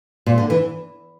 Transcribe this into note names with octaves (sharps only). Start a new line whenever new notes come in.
A#2
D3
E3